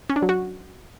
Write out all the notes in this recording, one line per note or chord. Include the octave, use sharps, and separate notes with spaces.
C#4
D4
F#3
F#4